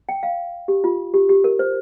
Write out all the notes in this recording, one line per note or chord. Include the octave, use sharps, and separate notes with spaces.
G5
F5
G4
F4
G4
G4
A#4
C5